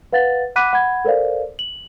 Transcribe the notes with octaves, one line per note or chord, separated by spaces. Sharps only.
B4 F5 F#5 A6
F#5 B5 D6 F#6 B6 D#7
F#5 B5 G#6
A4 A#4 C5 D5 F5
F#7